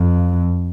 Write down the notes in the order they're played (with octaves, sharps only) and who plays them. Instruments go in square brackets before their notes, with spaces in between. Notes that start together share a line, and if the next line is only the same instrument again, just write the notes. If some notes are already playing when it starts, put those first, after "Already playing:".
Already playing: [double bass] F2